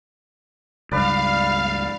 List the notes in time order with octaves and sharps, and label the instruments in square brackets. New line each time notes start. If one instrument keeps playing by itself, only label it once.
[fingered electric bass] C#2 G2 [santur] B4 D5 [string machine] F5